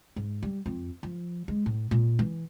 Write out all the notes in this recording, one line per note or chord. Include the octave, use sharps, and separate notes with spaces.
G#2
G3
F2
F3
G#3
A2
A#2
E3